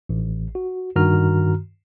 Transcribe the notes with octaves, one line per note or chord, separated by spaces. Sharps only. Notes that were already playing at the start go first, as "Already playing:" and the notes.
A1
F#4
G2 D#3 F#4 A#5 F6